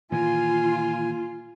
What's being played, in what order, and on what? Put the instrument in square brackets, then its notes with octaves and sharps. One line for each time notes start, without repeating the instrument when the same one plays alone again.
[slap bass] A#2 D#3 E3 [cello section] F4 [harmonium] G#5